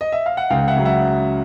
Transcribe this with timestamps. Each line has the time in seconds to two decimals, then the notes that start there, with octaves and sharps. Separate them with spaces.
0.01 D#5
0.12 E5
0.26 F5
0.37 F#5
0.50 C#2 F5 G5
0.68 E5 F#5
0.76 C#3 F#3
0.85 E5 F#5